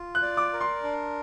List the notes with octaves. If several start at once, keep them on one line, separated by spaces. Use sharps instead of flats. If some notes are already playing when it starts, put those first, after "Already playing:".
Already playing: F4
F#6
D5
D6
A#4
C6
D4